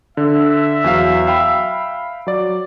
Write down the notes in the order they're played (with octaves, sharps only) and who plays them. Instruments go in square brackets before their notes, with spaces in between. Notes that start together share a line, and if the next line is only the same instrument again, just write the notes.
[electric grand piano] D3 [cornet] E5
[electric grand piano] E2 F#3 F5
F5 G5 B5
F#3 D5